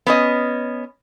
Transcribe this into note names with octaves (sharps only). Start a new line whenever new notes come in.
B3 C#4 D#5